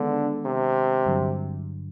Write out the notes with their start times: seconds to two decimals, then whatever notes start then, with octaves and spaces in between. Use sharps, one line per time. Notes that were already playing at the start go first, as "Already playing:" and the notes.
Already playing: D3 D#3 G#3 B3 D4
0.46 C3
1.06 G2 D3 F#3